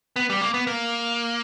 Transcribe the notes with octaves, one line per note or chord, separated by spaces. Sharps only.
B3
G3
A#3
B3
A#3